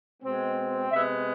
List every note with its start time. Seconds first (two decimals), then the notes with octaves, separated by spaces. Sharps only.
0.23 B2 G#3 C4
0.92 C3 G#3 B3 E5